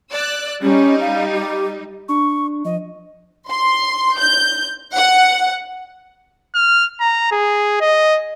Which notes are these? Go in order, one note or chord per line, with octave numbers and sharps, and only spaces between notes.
D5 E6 F#6
G3 C#4 D#4
F5
G4
D4 C#6
F3 D#5
C6
G6
F#5
F6
A#5
G#4
D#5